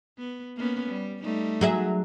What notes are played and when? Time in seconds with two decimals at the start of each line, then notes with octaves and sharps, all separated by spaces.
0.18 B3
0.56 A#3 B3 C#4
0.90 G3
1.22 G3 A3 D#4
1.61 F#3 G#4 E5